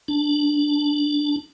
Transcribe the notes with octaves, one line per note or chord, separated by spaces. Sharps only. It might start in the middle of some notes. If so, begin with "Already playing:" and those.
D4